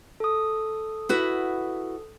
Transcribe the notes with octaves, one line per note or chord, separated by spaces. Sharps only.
A4 D#6
E4 F#4 B4